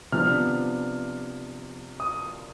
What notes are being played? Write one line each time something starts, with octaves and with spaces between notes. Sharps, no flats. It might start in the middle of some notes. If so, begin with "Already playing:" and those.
C3 F3 B3 D4 F6
D#6